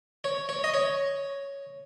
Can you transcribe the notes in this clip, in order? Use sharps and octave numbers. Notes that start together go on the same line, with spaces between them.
C#5
C#5
D#5
C#5